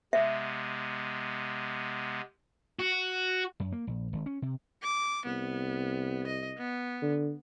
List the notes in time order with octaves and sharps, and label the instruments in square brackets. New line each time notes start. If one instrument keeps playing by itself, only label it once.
[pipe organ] C3 G#3 B3 [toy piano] E5
[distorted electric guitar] F#4
[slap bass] F#2
A#3
A#1
G#1
C#4
C3
[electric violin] D6
[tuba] C2 [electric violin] B3
[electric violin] D#5
B3
[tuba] D3